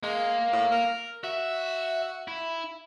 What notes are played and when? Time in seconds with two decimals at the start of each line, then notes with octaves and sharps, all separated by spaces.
0.03 G#3 A#3
0.52 A2
0.72 A#4
1.24 F#4 E5
2.28 E4